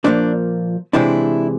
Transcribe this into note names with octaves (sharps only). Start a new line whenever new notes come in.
A#2 F3 A#3 C4 D4
C3 E3 G#3 D4 E4